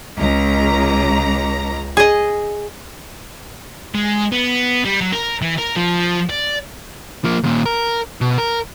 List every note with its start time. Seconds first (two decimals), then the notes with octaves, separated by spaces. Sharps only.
0.18 C#2 A#5
1.97 G#4 D#5
3.95 G#3
4.32 B3
4.85 G3
5.01 F#3
5.13 A#4
5.42 E3
5.59 A#4
5.77 F3
6.30 D5
7.24 F3 A#3
7.43 D#2 A#2
7.66 A#4
8.21 B2
8.38 A#4